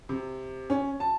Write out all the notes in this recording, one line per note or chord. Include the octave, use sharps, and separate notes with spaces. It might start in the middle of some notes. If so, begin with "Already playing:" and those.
C3
C#4
A5